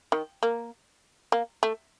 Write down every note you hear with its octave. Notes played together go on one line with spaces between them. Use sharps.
D#3
A#3
A#3
A3